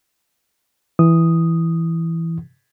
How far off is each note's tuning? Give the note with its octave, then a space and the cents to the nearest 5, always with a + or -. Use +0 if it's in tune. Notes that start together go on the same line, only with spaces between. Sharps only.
E3 +0 D#6 +0